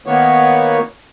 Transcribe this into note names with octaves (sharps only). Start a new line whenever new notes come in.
D#3 A#3 B3 C#5